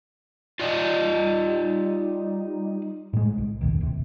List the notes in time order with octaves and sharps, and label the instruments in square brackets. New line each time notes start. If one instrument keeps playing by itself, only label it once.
[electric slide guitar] F4 D5 D#5
[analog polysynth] G3 D#4
[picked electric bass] A2 G#3
C2
F1 A#1 D#2
D1 C3